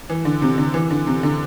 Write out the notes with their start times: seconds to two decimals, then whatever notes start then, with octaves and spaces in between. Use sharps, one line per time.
0.10 E3
0.25 D3
0.42 C3
0.58 D3
0.74 E3
0.90 D3
1.07 C3
1.23 D3